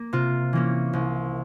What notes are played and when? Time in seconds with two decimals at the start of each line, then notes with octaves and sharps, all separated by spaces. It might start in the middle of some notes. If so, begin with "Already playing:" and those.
Already playing: A#3
0.13 C3 F4
0.53 E3 A#3 C#4
0.93 C2